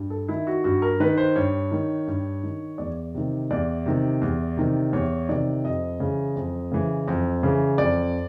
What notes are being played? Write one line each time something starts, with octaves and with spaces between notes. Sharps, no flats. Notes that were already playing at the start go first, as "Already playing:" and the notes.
Already playing: G2
A4
D#3 E4
F#4
G2 F#4
A#4
D#3 B4
C5
G2 C#5
D#3
G2
D#3
E2 D5
C3 D#3
E2 D5
C3 D#3
E2
C3 D#3
E2 C#5
C3 D#3 D5
F2 D#5
C#3 E3
F2
C#3 E3
F2
C#3 E3
F2 D5